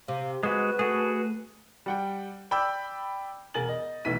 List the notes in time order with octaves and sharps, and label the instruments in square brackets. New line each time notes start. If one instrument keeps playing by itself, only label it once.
[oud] C3 [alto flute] F5
[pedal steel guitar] G#3 F#4 G#4 [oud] B3 [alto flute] B4
[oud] A3 [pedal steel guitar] F#4 G#4
[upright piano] G3 F#5 G5
D5 G5 B5 D6 E6 G6
E1 A#4 G#5 A6 F#7
D#5
B1 E3 A3 B6 D#7